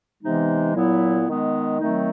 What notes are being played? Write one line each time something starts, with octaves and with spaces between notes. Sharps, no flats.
C3 E3 G#3 B3 D#4
A#2 F#3 B3 E4
D#3 G#3 B3
D#3 F#3 A3 C4 D#4